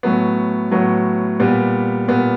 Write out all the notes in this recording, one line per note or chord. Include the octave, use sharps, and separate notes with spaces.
A2 F#3 B3
A2 F#3 B3
A#2 G3 B3
A#2 G3 B3